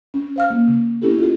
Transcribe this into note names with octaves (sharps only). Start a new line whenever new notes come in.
C#4
C5 F5 F6
A#3
C#3
B3 C#4 E4 G4 A4
F4 G#4